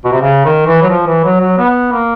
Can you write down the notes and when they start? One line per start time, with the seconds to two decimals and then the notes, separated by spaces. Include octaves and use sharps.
0.04 B2
0.12 C3
0.22 C#3
0.45 D#3
0.67 E3
0.82 F#3
0.90 F3
1.07 E3
1.24 F#3
1.41 F#3
1.58 B3
1.92 A#3